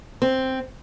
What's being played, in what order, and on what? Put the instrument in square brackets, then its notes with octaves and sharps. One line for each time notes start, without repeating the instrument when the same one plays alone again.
[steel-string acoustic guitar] C4